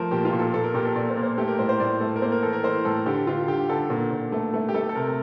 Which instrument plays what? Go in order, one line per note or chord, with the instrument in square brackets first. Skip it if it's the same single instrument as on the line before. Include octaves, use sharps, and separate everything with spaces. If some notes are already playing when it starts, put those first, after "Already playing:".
Already playing: [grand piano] F3 A3 A#4 C5
A#2 G4
F4
A#2
A4
A#2 A4
A#4
A#2 G4
A4
A#2 D5
C5
A#3
C5
A3 G4
A#4
A2 C5
C5
A2 D5
A3
A#4
A#3 C5
A#4
E3 A4
A#4
E3 C5
A2 A4
D3 G4
D3 F4
D3 G4
D3 A4
A#2
A#2
A3
A3
G4
A3 A4
A4
C3 A#4